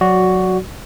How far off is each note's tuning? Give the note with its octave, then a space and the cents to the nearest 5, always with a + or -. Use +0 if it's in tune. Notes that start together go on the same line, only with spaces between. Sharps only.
F#3 -10 F#4 +5 D5 -15